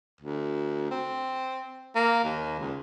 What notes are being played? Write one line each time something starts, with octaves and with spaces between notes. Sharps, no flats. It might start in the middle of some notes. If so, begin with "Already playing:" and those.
D2
C4
A#3
D#2
C#2